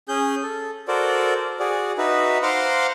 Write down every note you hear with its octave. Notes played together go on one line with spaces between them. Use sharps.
C#4 G#4 G6
A4
F#4 A4 A#4 C5 D5
F#4 G#4 D5
D#4 F#4 B4 E5
C5 F5 F#5 A#5 C6 D6